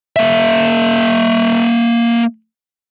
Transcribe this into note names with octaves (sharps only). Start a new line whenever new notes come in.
A#3 E5